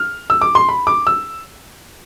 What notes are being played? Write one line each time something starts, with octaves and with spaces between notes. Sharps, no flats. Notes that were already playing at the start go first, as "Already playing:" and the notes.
Already playing: F6
E6
D6
C6
B5
D6
E6